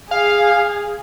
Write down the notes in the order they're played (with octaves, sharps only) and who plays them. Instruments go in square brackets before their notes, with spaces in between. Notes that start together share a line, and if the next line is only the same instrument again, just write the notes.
[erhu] G#4 [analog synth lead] F5